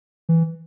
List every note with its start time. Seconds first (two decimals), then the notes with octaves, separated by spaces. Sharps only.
0.29 E3